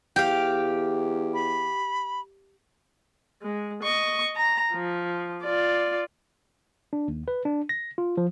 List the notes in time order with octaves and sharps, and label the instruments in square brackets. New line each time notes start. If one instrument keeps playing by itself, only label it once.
[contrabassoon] E2 [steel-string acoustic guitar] G4 [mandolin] F5 G5
[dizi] B5
[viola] G#3
D#5 C#6
A#5
F3
F4 D5
[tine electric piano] D4
D#2
B4
D4
A#6
F4
F3